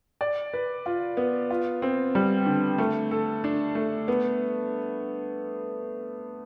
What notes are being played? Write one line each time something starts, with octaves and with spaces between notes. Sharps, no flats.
D5
B4
F4
B3
F4
C4
G3
D3
A3
A4
D4
A3
B3